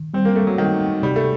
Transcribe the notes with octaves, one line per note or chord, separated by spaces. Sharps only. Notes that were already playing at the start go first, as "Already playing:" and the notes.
Already playing: D#3
G3 C4
A#3
G3 A3
F#3
D#3 G3
C4
C3 G3
A3